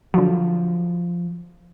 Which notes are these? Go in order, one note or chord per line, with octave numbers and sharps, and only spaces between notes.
D3 F3 F#3